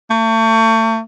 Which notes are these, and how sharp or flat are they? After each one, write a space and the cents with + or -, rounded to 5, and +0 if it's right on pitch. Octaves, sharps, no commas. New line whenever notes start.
A3 +35